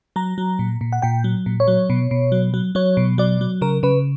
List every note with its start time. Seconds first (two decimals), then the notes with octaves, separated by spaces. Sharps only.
0.16 F#3 A#5
0.38 F#3
0.59 A#2
0.81 A#2
0.93 F#5
1.02 A#2 G5
1.24 F#3
1.46 A#2
1.60 C#5
1.68 F#3
1.90 B2
2.11 B2
2.32 F#3
2.54 F#3
2.75 F#3 C#5
2.97 B2
3.18 F#3 D5
3.41 F#3
3.61 C#3 A#4
3.83 C#3 B4